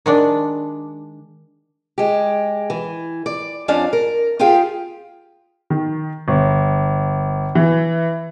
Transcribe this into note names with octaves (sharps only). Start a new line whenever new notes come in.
D#3 G#3 D4
G#3 G4
E3
D5
F2 C#4 D4 D5 F5
A#4
F4 G4 G#4 F5 G5
D#3
G1
E3